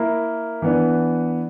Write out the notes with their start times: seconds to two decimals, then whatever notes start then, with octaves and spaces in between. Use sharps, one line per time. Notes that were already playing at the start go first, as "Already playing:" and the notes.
Already playing: A#3 E4 A#4
0.62 E3 B3 D4